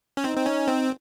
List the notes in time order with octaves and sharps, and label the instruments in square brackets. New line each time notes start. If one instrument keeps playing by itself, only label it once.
[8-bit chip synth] C#4
[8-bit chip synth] C4 [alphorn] D#4
[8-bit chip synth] C4
C#4
C4